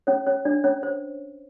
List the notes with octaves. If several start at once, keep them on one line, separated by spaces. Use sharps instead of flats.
C#4 C#5
C#4 C#5
D4 D5
C#4 C#5
C5